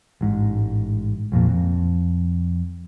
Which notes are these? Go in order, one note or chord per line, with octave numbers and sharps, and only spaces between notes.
A1 G#2
A#1 F2 A#2
F2